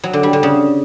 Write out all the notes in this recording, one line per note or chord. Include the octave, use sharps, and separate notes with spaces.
F#3
D3
G3
D3
C#3